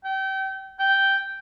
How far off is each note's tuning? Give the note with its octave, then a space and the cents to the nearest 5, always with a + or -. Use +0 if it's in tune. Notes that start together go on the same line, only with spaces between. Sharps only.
G5 -30
G5 -5